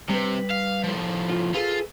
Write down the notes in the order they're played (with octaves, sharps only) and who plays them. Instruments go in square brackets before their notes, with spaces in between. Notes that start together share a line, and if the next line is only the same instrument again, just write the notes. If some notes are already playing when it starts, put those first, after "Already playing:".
[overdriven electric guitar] C3 [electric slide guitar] G3 B4
[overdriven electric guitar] F5
A2 F3
[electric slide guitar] F4
[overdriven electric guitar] F4 [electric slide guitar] G#4 A4 B4